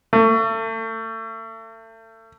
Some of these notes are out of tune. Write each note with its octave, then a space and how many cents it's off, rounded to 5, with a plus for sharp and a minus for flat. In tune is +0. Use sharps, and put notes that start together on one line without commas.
A3 +35